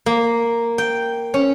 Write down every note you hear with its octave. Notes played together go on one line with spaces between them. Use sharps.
A#3
G5
C#4